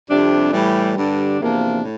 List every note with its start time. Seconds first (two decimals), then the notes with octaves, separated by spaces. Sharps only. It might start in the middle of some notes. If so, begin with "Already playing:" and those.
0.09 F2 C3 G3 D4
0.52 A2 E3 G3
0.96 G2 D3 G3 D4
1.38 E2 C3 F3 A#3 D4
1.82 A2